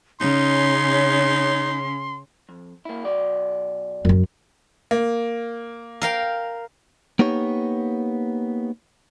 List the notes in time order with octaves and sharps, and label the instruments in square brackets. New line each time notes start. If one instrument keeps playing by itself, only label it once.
[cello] C#3 C#4 [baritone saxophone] D#4 [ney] C#5 [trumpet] C6
[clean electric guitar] F2
A#3 E4
B1 F#4 D5
[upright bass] F#2 F#3
[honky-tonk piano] A#3
[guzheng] A#4 F5 G5
[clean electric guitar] A#3 B3 D#4 G4 C#5